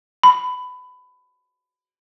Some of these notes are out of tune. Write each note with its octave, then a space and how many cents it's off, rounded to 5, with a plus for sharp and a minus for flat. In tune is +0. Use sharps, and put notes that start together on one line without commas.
B5 +20